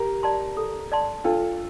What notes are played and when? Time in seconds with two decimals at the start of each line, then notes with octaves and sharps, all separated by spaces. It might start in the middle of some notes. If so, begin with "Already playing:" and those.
Already playing: G4 A#4
0.23 D5 A5 C6
0.57 A4
0.92 D5 A5 C6
1.24 D4 F4 A4